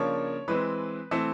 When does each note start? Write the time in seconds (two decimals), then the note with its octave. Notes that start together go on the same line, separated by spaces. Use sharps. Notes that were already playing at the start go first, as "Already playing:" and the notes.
Already playing: C#3 F3 A#3 D4 C#5
0.48 E3 G#3 C4 B4
1.11 E3 A3 C4